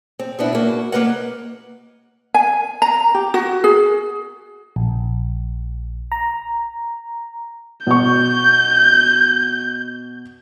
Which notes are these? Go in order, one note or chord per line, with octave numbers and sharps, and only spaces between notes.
C4
B2 B3 D4 E4
A#3 F#4
A#3 A#4 B4 D#5 F#5
G#5
A#5
G4
F#4
G#4
A#1
A#5
B2 C#6 G6